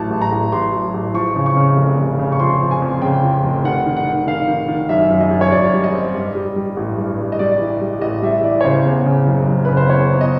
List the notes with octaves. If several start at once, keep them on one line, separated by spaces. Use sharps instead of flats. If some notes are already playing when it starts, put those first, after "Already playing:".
Already playing: A1 A2 F#3 A5
A1
A#5
A1
A1 C6
F#3
A1
F3 C#6
C#3
C#6
C#3
F1
C#3
C#3
C#6
F3 C6
F3
G#5
F2
C#3 G5
F3
F1
D#3 F#5
D#3
F#5
D#3
D#3 F5
D#3
D#3
F#2 E5
F#2
D#5
F#2
C#5
F#2 D5
G3
D#5
C4
G2
G3
G3
A1
G2
G2
D#5
G3 D5
E3
G3
A1 D#5
G3 E5
E3 D5
C#5
C#3 C5
E2
C#3
F#1
F#1
C#3 B4
C5
E2 C#5
E2
D#5